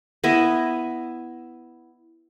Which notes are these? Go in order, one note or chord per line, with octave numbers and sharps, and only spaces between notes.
B3 E4 D#5 E5